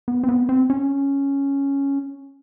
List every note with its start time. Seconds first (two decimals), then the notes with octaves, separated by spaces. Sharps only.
0.08 B3
0.24 C4
0.29 B3
0.49 C4
0.70 C#4